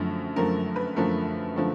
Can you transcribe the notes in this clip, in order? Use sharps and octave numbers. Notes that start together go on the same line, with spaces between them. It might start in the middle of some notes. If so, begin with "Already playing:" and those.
Already playing: F#2 D3 F3 A3
F#2 D3 F3 A3 A#4
B4
F#2 D3 F3 A3 A#4
D3 F3 A3